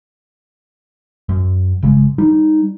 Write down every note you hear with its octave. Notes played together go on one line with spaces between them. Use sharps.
F#2
G1 C#3 G#3
G3 D#4